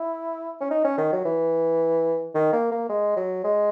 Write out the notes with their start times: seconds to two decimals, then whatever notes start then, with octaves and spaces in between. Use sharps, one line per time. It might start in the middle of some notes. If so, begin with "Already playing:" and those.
Already playing: E4
0.61 C#4
0.71 D#4
0.85 C#4
0.98 D#3
1.13 F#3
1.25 E3
2.35 D#3
2.53 A#3
2.71 A#3
2.89 G#3
3.16 F#3
3.44 G#3